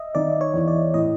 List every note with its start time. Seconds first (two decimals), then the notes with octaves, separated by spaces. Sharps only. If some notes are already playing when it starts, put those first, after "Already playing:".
Already playing: D#5 E5
0.15 D#3 D5
0.41 C#5
0.54 E2
0.68 D5
0.94 A2 D#5